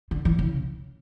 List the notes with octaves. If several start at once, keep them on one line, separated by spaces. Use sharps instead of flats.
D3
E3
C#3